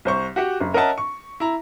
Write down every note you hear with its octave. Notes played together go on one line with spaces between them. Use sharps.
C2 C5 C#6
F#4 G4 F#5
F#1
C#4 A#4 D#5 E5 F#5 A5
C#6
E4 A#5